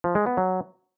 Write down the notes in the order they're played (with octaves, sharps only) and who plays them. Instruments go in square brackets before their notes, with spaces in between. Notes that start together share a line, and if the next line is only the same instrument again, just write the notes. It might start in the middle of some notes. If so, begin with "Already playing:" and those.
[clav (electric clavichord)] F3
G#3
B3
F#3